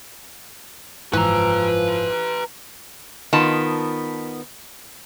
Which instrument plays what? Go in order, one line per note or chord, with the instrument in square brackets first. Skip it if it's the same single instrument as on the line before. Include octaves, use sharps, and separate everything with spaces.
[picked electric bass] F#1 G#2 [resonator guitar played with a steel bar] E3 [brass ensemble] F3 [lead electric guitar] B4 A#5
[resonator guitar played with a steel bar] D#3 B3 F4 A5